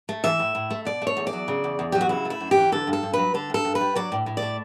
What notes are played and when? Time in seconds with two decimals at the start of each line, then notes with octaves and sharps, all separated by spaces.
0.09 A3
0.24 E3 E5
0.39 A2
0.55 A2
0.71 A3
0.85 B2 D5
1.02 A3
1.07 C#5
1.17 E2
1.27 D5
1.33 F#3
1.48 C#3
1.64 E2
1.79 E2
1.92 F#3 G4
2.01 F#4
2.09 C#3 E4
2.25 A3
2.30 E4
2.40 F#2
2.51 G4
2.57 E3
2.72 D3 A4
2.87 G2
2.93 A4
3.03 G2
3.13 F#3 B4
3.34 D3 A4
3.50 G2 A4
3.65 G2
3.75 B4
3.81 G3
3.95 F#3 D5
4.12 A2
4.26 A2
4.37 D5
4.42 A3